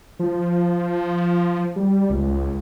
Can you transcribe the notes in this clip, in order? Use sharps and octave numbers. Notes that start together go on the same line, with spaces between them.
F3
G3
C#2